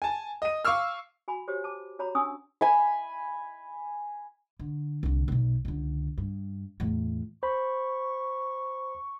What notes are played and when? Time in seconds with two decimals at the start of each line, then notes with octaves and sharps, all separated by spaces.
0.02 G#5 A5
0.42 D#5 D#7
0.65 F5 C#6 D6 E6 F6
1.28 F#4 G#5 B5
1.48 F#4 G4 C5 C#5
1.64 A5 D6
1.99 F#4 C#5 A#5 B5
2.15 C#4 D4 G#5 C#6 D#6 E6
2.61 G#5 B5
4.60 D3
5.03 C2 D3
5.28 B1 B2
5.65 C#2 D3
6.18 G2
6.80 E2 A2
7.43 C5 B5 C#6